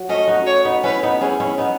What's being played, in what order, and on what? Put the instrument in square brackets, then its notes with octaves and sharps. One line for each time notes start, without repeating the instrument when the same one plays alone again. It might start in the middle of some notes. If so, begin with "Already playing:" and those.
Already playing: [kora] F#3
[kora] A3 C#4 [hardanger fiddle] D#5
[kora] D#4 F#4
[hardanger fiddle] C#5
[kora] B3 D#4
[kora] C#4 E4 [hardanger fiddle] B4
[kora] B3 D#4
[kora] C#4 E4 [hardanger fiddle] G#4
[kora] C#4 E4
B3 D#4